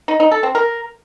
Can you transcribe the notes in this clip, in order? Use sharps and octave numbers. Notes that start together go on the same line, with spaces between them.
D#4
D#4
A4
C4
A#4